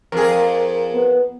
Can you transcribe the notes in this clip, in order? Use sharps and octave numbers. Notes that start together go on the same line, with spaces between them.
F2 G#4 A#4
B3